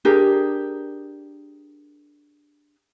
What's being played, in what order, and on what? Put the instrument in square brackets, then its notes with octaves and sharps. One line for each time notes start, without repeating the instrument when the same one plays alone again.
[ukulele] D4 G4 G#4 A#4